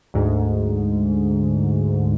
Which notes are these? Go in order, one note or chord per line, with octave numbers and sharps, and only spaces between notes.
D2 G#2